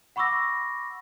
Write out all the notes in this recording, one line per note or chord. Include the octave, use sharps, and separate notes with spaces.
F#5 B5 C#6 D6 E6 A#6